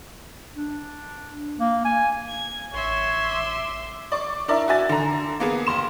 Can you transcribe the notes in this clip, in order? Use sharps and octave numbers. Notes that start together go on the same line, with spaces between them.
D4
A#3
G#5
G#6
A1 C#5 E5 C6
D6
D5 C#6 D6
D4 E4 A#4 D5 E5
F#4 E5 G#5 A6
D3 A#5
A#3 B3 G#4
F#1 C6 E7